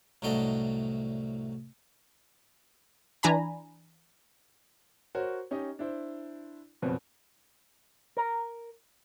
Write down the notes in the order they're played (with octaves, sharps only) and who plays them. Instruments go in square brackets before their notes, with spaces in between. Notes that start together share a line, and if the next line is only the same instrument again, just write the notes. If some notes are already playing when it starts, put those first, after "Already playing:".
[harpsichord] C2 A2 F#3 D4 D#5
[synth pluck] E3 D4 G#5 A#5 B5
[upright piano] F#4 A#4 C5 C#5
C#4 D#4 G4 D#5
D4 E4 C5
F#1 F2 B2 C4 B4
[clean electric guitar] A#4